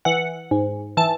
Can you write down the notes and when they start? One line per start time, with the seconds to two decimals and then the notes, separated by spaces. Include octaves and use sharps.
0.05 E3 F#5
0.51 G#2
0.97 E3 A5